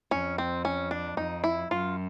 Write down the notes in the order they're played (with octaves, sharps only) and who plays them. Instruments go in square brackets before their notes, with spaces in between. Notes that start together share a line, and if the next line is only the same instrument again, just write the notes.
[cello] F2 [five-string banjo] C#4
[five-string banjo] C4
C#4
D4
[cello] F2 [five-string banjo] D#4
[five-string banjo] E4
[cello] F#2 [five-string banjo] F4